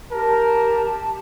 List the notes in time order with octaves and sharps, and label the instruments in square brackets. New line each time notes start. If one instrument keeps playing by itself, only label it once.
[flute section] G4 A5 [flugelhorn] A#4